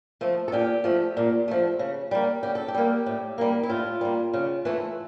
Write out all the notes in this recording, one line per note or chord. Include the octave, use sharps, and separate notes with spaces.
F3 A3
A4
A#2 G4
F3 A3
A#2
F3 A3
C#3
G3 A#3
C#3 G4
A4
G4
G3 A#3
A2
G3 A#3
E4
A2 F4
G3 A#3
C#3
E3 A3